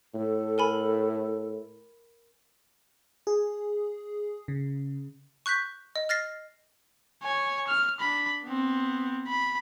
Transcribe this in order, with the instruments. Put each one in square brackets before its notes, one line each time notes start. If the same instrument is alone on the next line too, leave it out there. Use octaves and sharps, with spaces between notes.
[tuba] A2 [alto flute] A4
[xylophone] A#4 G#5 B5
[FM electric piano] G#4
C#3
[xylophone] C#6 F#6 G6 B6
D#5
F6 A6 A#6 C7
[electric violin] C#5 G#5
F6
D4 B5
B3 C4
B5